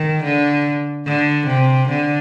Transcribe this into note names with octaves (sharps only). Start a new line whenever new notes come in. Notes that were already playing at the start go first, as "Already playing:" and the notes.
Already playing: D#3
D3
D3
C3
D3